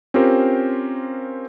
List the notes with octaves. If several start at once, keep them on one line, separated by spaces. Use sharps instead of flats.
C4 C#4 F4 G4 A#4 C5